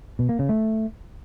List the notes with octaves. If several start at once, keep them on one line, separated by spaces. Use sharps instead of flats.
B2
A#3
C#3
A3